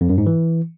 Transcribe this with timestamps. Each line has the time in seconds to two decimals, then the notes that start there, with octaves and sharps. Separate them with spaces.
0.01 F2
0.09 F#2
0.18 G#2
0.26 E3